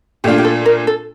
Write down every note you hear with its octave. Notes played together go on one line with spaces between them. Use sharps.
A#2 A3 D4 F4 G4
G4
A4
A#4
A4